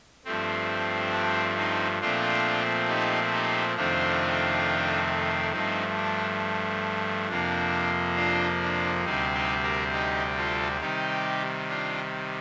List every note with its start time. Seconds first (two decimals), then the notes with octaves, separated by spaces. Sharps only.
0.25 G2 F3 A3 C4
1.12 D4
1.57 C4 D#4
2.01 A#2 F3 A3 C4 D4 F4
2.88 D#4 G4
3.33 D#4 G4
3.77 F2 C3 D#3 A3 C4 D4 F4
5.52 G2 F3 A3 C4 D#4
5.97 D4
7.29 F2 C3 F3 A#3 D4
8.17 D4 F4
8.61 D4
9.05 D2 C3 G3 C4 D#4
9.34 D#4 G4
9.63 G4 A#4
9.93 D#4 G4
10.37 F4 A4
10.80 C3 D#3 G3 D#4 G4
11.69 D4 F4